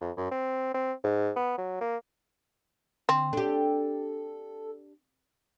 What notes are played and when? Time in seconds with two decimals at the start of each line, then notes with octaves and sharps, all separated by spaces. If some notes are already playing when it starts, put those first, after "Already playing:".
0.01 F2
0.17 F#2
0.31 C4
0.74 C4
1.04 G#2
1.36 B3
1.58 F#3
1.81 A#3
3.09 D3 C4
3.33 D4 G4 A4